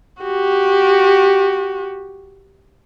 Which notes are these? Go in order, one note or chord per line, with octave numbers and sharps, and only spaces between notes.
F#4 G4